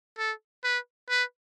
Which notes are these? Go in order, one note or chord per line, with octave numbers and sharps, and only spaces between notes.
A4
B4
B4